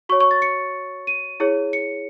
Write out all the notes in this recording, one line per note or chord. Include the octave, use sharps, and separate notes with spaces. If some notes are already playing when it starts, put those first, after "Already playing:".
F#4 C#5 C#6
C#6
A6
C#7
D#7
E4 G#4 C#5
C#7